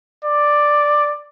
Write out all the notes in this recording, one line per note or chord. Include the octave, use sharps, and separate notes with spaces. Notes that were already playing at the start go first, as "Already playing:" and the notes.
D5